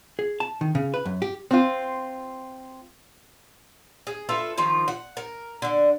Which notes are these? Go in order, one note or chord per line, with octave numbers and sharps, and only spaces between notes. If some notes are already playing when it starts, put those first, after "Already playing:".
G#4
A5
D#3
C#3
B4
F#2
G4
C4 F4
G#4
F4 A4 B4 E5
D#3 F3 F4
F#5
A#4
D3 F#5